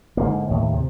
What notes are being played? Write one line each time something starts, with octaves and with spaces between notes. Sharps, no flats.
G#2 D3 A#3
D#2 A2
C3